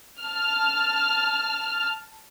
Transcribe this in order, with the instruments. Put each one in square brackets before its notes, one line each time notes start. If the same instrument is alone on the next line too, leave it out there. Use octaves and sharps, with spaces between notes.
[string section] A5 F6